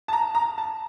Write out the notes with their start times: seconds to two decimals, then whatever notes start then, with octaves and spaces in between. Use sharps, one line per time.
0.08 A5
0.13 A#5
0.35 A#5
0.58 A5